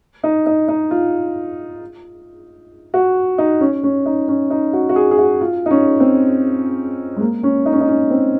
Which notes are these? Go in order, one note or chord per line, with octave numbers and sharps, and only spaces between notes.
D#4
D#4
D#4
F4
F#4
D#4
C#4
C#4
D#4
C#4
D#4
F#4
F#4
G#4
G#4
F#4
F4
D#4
C#4
C4
G#3
A#3
C#4
D#4
C#4
D#4
C#4
C4